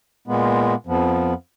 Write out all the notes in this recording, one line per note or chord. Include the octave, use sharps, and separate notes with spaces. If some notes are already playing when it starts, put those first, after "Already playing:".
A#2 G#3 B3
F2 F3 B3